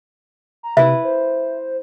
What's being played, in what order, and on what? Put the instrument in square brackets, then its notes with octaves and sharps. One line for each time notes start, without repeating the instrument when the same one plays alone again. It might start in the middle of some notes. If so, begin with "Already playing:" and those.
[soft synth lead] A#5
[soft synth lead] C3 [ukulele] E4 B4 [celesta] E5
[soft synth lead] C5